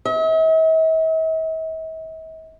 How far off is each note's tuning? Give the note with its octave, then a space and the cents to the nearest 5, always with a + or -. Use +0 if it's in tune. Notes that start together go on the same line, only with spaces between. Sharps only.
E5 -45